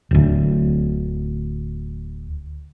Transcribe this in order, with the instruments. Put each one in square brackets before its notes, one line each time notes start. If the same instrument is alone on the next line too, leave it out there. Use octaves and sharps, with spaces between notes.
[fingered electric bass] D1 D2